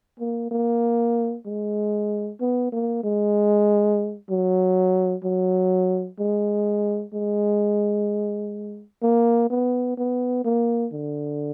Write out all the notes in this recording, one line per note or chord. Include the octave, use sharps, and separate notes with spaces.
A#3
A#3
G#3
B3
A#3
G#3
F#3
F#3
G#3
G#3
A#3
B3
B3
A#3
D3